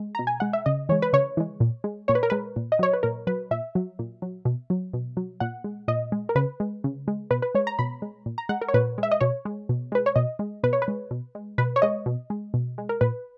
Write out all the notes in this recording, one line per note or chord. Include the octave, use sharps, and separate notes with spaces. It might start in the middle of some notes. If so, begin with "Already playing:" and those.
Already playing: G#3
B2 A#5
G#5
G#3 F#5
E5
C#3 D#5
E3 G#3 C#5
B4
C#3 C#5
E3 G#3
A#2
G#3
A#2 C#5
B4
A#4
G#3 B4
A#2
D#5
F#3 C#5
B4
A#2 A#4
F#3 B4
A#2 E5
F#3
A#2
F#3
B2
F#3
B2
F#3
A#2 F#5
G#3
A#2 D#5
G#3
A#4
C#3 B4
G#3
C#3
G#3
B2 B4
B4
G#3 C#5
A#5
B2 B5
G#3
A#2
A#5
G#3 F#5
A#4
C#5
A#2 B4
G#3
E5
D#5
B2 C#5
G#3
B2
G#3 B4
C#5
B2 D#5
G#3
B2 B4
C#5
B4
G#3
B2
G#3
B2 B4
C#5
G#3 D#5
B2
G#3
B2
G#3
A#4
A#2 B4